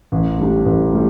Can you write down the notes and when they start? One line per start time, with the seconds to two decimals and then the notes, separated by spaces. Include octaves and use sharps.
0.12 A1
0.38 A2 G3 D4
0.65 A1
0.93 A2 G3